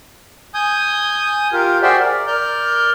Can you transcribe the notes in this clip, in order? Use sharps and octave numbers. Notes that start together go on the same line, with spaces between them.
G#5 D#6 G6
F4 G4 A#4
F#4 G#4 C5 D5 E5 G5
A#4 D5
A#4 D5 F6 G6